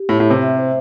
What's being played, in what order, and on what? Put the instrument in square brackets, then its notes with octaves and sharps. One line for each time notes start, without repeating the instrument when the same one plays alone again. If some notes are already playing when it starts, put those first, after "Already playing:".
Already playing: [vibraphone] G4
[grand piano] A2 [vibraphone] E4
[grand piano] A2
[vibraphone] E5
[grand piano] C3
[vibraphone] E5
C5